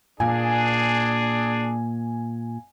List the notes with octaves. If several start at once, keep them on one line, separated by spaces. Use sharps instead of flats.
A#2 D4 G#4 G#5